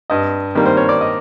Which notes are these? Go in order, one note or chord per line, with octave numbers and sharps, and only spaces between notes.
G2 D#5
D#3 G3 A#3
C5
C#5
D5
D#5